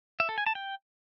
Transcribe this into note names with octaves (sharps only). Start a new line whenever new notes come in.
E5
A4
G#5
A5
G5